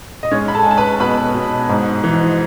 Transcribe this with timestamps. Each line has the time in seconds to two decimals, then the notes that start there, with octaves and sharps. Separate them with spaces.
0.23 D#5
0.31 G#3 C#4 C#5
0.48 B5
0.55 A4 A5
0.63 G#3 G#5
0.71 A5
0.77 B4 B5
1.00 B2 B4 B5
1.35 B2
1.69 G#2
2.04 E3